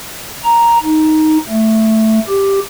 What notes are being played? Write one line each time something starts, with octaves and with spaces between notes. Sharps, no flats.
A#5
D#4
A3
G4